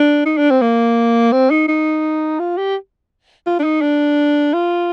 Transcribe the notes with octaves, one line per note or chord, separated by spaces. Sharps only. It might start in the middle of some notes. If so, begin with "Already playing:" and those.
Already playing: D4
D#4
D4
C4
A#3
C4
D#4
D#4
F4
G4
F4
D4
D#4
D4
F4